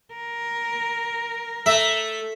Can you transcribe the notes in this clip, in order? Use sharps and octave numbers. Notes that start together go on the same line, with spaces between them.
A#4
A3 E5